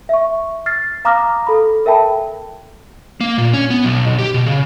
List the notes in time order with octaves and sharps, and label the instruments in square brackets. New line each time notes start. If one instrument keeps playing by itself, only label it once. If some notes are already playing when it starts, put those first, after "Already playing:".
[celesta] E5 C#6
F6 A6 C7
F5 A#5 D6 D#6 F6 A#6
A4 B5
A4 A#4 E5 G5 A5 B5
[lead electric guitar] A#3
A#2
C#4
B3
B1
B1
G4
B2
C#3